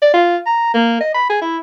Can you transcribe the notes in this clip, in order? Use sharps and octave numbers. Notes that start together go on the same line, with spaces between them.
D5
F4
A#5
A#3
D#5
B5
G#4
E4